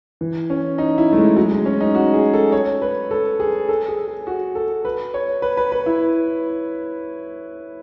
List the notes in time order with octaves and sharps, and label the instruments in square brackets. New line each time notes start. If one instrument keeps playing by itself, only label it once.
[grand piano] E3
C#4
D#4
E4
A3
G#3
F#3
G#3
C#4
D#4
F#4
G#4
A4
C#5
B4
A4
G#4
A4
G#4
G#4
F#4
A4
B4
C#5
B4
B4
B4
E4